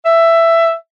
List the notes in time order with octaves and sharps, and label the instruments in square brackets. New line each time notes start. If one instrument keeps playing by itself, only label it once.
[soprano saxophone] E5